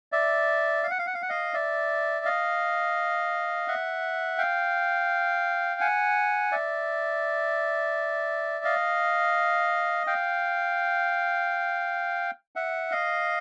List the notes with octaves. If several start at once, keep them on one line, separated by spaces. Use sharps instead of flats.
D5 E5
F5
F#5
F5
F#5
F5
F#5
D#5 F5
D5 E5
D#5 F5
E5 F#5
F5 G5
F#5 G#5
D5 E5
D#5 F5
F5 G5
E5 F#5
D#5 F5